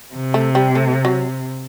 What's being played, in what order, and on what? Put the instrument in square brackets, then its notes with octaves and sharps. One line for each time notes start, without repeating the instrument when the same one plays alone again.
[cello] C3
[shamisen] A3
G3
A3
F#3